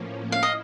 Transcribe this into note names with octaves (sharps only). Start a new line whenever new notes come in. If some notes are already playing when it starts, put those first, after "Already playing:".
Already playing: A2 F3 A#3 C#4
E4 F5
D#5